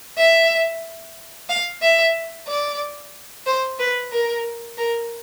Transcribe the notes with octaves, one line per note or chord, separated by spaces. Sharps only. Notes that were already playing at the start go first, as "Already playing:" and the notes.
E5
F5
E5
D5
C5
B4
A#4
A#4